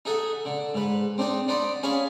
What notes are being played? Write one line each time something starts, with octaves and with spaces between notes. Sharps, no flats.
D#4 G#4 A4 E5 F#5
D3
G#2 B4
C4 D4 D#4 C5
D4 D#4 C5 D5 F#5 B5
C#4 G#4 F5 G#5 A5 B5